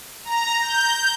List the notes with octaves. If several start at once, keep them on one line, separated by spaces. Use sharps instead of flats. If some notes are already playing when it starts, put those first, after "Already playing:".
A#5
G6